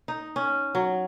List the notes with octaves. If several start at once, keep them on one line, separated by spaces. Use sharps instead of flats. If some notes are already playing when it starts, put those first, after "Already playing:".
D#4
C#4
F#3